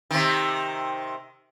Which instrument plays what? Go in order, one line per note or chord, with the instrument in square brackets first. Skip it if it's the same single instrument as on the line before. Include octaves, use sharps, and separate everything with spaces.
[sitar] C3 D#3